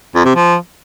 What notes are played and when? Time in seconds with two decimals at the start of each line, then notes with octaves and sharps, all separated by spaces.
0.15 F2
0.25 C3
0.36 F3